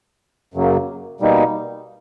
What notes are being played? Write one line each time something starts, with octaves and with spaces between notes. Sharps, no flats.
F#2 C#3 F#3 A#3
B2 G3 A#3 D#4